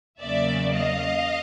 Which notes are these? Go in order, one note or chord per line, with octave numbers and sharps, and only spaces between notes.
E2 C#3 F#3 A#3 D5 E5
D#5 F5